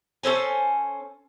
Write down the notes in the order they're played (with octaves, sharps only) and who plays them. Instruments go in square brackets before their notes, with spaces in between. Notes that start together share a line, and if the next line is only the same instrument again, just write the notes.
[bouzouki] C#4 A4 C5 G#5